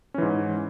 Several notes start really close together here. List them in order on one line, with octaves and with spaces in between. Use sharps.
C#4 E3 G#2